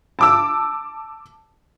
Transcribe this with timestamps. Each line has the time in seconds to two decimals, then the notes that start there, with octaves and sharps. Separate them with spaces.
0.19 A5 D6 E6